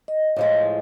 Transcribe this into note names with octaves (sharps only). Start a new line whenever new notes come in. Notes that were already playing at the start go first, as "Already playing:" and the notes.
D#5
A2 F3 G#3